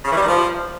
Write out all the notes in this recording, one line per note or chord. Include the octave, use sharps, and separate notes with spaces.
C#3
E3
G3
D#3
F3